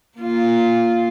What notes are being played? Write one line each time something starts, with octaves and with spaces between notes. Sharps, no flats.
A#3 F4